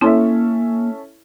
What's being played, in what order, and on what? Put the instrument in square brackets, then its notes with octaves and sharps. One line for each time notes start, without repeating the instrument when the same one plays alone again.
[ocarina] A#3 [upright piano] C#4 A4 E5 [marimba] E4 A5 C6